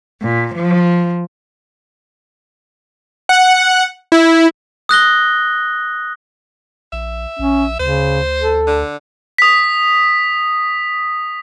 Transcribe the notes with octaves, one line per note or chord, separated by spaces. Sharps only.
A#2
F3
F#5
E4
D#6 F#6 A#6 G7
A#1 E5
A#1 C#4
D2 C#3 C5
A4
D3
D#6 B6